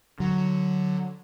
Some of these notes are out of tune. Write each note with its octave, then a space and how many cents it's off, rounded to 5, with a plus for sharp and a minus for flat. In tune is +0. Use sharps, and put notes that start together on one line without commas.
D3 +10 F#3 +0